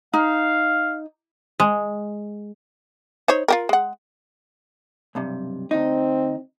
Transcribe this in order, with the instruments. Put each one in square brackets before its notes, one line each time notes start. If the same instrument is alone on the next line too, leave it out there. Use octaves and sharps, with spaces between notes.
[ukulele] D#4 [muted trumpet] F5
[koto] G#3
[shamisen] D#4 C5 C#5
F4 G4 A#4
G#3 F#5
[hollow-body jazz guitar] B1 G2 C3
[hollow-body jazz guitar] D2 D#4 [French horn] C4